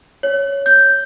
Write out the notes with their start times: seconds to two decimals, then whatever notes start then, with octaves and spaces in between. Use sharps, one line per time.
0.23 C#5
0.66 G6